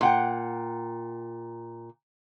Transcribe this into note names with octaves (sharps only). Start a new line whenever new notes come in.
A#2 F#5 G5